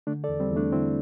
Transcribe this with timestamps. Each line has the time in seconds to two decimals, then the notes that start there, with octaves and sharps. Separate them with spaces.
0.07 D3 A3 D4
0.24 A4 D5
0.29 E2
0.40 G3 C4
0.50 E2
0.56 A3 D4
0.72 D3 C4 E4